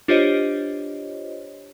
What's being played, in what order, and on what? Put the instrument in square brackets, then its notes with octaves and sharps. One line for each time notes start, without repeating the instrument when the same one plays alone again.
[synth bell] D4 F4 G4 C5 C#5 D#5